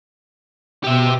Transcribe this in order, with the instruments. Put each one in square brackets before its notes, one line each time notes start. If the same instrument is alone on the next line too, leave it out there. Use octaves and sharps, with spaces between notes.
[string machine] B2 [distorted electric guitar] G4 E5